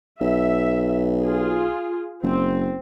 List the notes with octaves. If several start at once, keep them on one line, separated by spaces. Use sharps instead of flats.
B1 E5
F4 G#4
F#1 C4